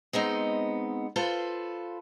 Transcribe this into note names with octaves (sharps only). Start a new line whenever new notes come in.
G#3 B3 C4 D#4
F4 A4 B4 C5